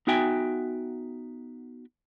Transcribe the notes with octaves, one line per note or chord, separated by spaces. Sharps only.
B3 D#4 F#4 E5 G5 G#5